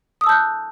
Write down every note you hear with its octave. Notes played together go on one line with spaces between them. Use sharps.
A5 D#6 E6 F#6 G6